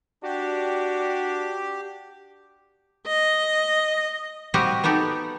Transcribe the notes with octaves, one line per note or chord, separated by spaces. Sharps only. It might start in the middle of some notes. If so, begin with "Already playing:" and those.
D4 F#4 G4
D#5
G3 C4 F#4 G4 D#5 E5
B3 D#4 F#4 G4 A4